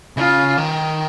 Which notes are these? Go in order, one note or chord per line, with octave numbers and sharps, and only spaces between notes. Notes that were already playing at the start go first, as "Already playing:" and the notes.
C#3 F4
D#3